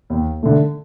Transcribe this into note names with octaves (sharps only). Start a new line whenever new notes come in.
D#2
D3 A3